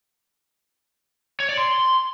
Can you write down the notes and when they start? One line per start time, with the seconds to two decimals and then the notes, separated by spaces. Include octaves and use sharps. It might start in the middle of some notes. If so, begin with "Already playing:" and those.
1.40 C#5
1.49 D5
1.57 C6